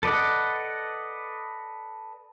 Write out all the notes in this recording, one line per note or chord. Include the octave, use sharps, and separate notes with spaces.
A4 B4 D5 D#5 F#5